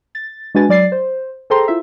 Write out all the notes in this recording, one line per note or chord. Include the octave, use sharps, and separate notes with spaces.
A6
G#3 D4 F#4 B4 G#5 A6
F#3 D5 A6 C7
C5
G#4 A4 C5 G5 A#5 C6
E4 F4 C5 E5